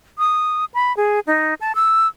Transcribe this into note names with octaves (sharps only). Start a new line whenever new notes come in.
D#6
B5
G#4
D#4
A5
E6